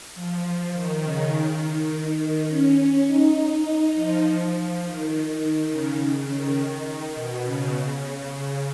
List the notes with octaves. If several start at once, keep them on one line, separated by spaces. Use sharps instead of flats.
F3
D#3
C#3
D#3
C#4
D#4
F3
D#3
D#3
C#3
C#3
D#3
D#3
B2
C#3
C#3